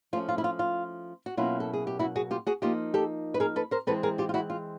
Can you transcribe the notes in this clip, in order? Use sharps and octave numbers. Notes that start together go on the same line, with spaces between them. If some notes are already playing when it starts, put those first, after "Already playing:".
F3 A3 C#4 F4
F4
E4
F4
F4
F#4
B2 F#3 A#3 C#4 E4 F4
A4
G#4
G4
E4 F#4
F#4 G#4
F4 G4
F#4 G#4
F3 A#3 D#4 F4 G4
G4 A4
B4
G#4 A#4
A4 B4
A#4 C5
E3 G#3 C4 A4 B4
G#4 A#4
F4 G4
F4
E4 F#4
F4